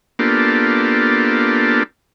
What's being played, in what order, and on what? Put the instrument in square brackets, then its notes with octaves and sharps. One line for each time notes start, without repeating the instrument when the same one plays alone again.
[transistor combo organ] A#3 B3 D4 F4 G4 A4